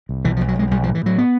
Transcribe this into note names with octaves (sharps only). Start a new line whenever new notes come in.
C2
B1 E3
B1 F3
F#3
B1 G#3
B1 G3
A2 F3
E3
A2 F#3
B3